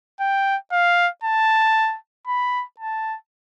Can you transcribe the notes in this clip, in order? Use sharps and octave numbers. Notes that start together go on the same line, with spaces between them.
G5
F5
A5
B5
A5